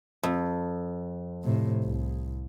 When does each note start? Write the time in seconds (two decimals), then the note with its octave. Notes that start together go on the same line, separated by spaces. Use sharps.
0.23 F2
1.44 A2 C3
1.84 C2